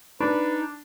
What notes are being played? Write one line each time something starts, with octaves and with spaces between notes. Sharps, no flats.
D4 D#4 B4